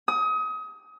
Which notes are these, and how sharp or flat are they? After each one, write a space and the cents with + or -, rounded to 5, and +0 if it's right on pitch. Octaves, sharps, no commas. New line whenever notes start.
D#6 +30